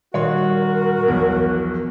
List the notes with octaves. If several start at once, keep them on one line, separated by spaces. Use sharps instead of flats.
A#2 D#3 G3 F#4 A#4 C#5 D#5 C6
B1 E2 F3 B3